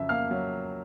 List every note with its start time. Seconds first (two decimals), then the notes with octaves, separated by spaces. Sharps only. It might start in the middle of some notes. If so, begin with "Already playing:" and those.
Already playing: F2 C#3 F#3 E5
0.09 A#3 F5 F6
0.31 F#3